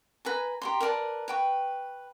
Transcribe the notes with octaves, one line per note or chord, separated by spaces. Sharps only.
B4 G#5 A#5
G4 A#5 C6
A#4 B4 D5 A5
B4 G5 C#6